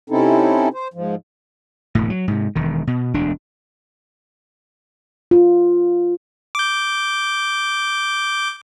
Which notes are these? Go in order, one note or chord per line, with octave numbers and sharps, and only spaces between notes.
C3 C4 C#4 D#4 E4 A4
C5
G#2 F3
E1 D2 A2
F#3
G#2 C3
E1 D#3
B2
E1 D2 D4
F4
D6 G6